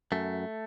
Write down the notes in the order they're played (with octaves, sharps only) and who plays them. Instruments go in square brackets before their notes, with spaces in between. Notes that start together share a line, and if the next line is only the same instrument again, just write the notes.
[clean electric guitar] F#2 A3